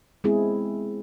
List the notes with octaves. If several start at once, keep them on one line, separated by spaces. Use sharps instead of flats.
G#3 B3 C4 E4 G#4